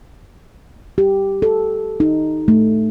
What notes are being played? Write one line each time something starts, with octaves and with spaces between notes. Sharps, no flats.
G4
A4
D#4
A3